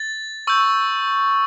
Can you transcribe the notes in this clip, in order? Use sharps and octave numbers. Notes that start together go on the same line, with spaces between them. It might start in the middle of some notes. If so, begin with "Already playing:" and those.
Already playing: A6
C#6 E6 G6